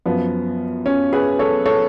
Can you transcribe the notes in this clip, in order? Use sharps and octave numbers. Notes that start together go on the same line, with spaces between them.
F#2 F3 B3
C#4
G#4 B4
A4 C#5
A4 C#5